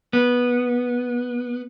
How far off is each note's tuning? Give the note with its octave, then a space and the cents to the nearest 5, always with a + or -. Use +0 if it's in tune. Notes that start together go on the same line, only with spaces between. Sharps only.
B3 -15